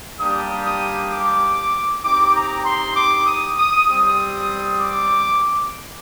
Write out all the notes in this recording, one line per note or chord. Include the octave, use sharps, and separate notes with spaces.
G3 A#3 D4 G4 D#6
D#6
D6
C4 D#4 G4 D6
A#5
C6
D6
D#6
D#6
G3 C4 G4 D#6
D6